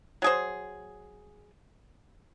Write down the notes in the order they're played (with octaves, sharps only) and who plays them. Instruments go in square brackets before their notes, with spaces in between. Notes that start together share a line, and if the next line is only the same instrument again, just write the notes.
[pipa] F#3 G#4 C5